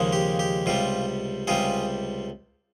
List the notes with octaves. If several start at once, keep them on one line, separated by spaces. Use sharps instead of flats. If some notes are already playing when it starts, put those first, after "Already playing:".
Already playing: D#2 C#3 F3 G#3
G4
G4
C#2 C3 G3 F4
C#2 C3 G3 F4 G#4